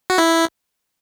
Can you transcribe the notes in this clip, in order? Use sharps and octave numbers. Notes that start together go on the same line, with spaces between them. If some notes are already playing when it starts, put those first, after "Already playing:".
F#4
E4